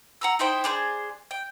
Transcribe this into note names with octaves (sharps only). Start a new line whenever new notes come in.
F#5 A#5 E6
D#4 E4 C5 G5
D4 G#4 B4 C5
G5